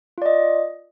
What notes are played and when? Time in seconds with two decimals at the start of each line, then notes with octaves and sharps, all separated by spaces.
0.18 F4
0.22 D5
0.26 D#5